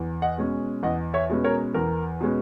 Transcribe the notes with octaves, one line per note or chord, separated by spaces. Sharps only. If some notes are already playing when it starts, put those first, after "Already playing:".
Already playing: E2
D#5 F#5
B2 G#3 C#4
E2 D#5 F#5
C#5 E5
B2 G#3 C#4
A#4 C#5
E2 A#4
B2 G#3 C#4